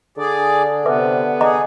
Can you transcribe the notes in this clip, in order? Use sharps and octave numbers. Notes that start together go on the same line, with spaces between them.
D3 G#4 D5
C3 B3 B4 E5 D6
G#4 D#5 A#5 D6